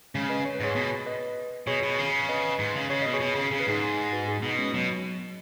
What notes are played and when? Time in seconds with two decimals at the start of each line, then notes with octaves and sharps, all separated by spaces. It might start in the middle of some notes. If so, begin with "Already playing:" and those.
0.15 C#3 G#3 C#4
0.29 B4 D#5
0.45 C#5
0.55 B4
0.60 G#2 G#4 C#5
0.76 B2
1.06 B4 D#5
1.67 B2 G#4 C#5
1.83 B2
1.98 C#3
2.29 B4 D#5
2.59 G#2
2.75 C#3
2.90 C#3 C#5
3.02 B2 D#5
3.13 G#4 C#5
3.21 B2
3.35 C#3
3.51 C#3 G#4
3.60 B4
3.67 G#2 D#4 G#4
4.12 F#4 B4
4.28 D#4 G#4
4.42 B2 B3 D#4
4.58 G#3 C#4
4.74 B2 F#3 B3